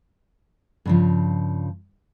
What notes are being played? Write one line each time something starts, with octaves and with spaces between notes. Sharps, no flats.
G2 C#3 F3